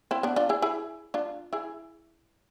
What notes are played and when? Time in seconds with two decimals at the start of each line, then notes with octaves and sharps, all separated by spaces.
0.11 C4 E4
0.23 B3 D4
0.36 D4 F4
0.49 E4 G#4
0.62 E4 G#4
1.14 D4 F4
1.53 E4 G#4